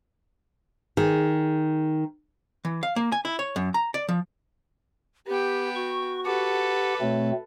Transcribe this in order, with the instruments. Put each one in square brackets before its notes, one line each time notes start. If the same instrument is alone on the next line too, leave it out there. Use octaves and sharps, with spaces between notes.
[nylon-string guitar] D#3 G#4
[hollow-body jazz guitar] E3
F5
A#3
G#5
E4
C#5
F#2
A#5
D5
F3
[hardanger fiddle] B3 G5 [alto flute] G4
[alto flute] F#4 [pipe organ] C#6
[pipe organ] G4 F#5 [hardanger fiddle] A4 B4
[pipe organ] B2 A3 C4 [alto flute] C#5